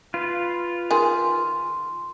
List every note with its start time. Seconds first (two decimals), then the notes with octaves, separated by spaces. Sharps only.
0.14 F4 B4
0.91 D#3 G#4 C6